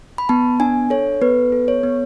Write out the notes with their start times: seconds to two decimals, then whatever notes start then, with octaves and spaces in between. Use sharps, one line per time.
0.18 B5
0.29 B3 A5
0.60 D4 G#5
0.90 A4 C#5
1.21 B3 B4
1.52 A4
1.68 C#5
1.83 B3